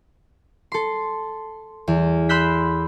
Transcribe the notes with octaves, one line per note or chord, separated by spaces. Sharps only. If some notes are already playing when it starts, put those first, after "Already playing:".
A4 C6
E2
B5 C6 E6 F#6 G6 B6